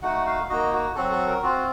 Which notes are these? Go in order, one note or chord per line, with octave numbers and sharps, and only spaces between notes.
A3 D#4 F#4 F#5
F5
A#3 D#4 F#4 D#5
F#4
F#3 C4 F#4 A4
A4
A#4
C4 F4 F#4